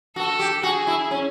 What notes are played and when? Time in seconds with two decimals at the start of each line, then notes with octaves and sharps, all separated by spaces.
0.16 F#4 A4
0.39 G4
0.63 F#4 G#4
0.87 E4
1.11 C#4